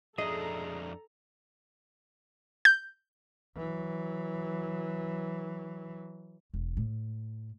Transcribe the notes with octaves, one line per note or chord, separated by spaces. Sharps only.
F2 D4 G#4 A4 D#5 E5 A#5
G6
E3 F#3
E1
A2